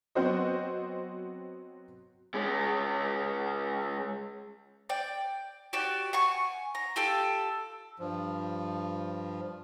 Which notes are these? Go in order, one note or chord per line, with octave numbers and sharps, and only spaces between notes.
F#3 B3 C4 F#4 C5 D#5
G#3 C#4
D5 G5
F#4 G4 D5
F#5 G#5 C#6
A#5
F4 G4 A4
G2 F3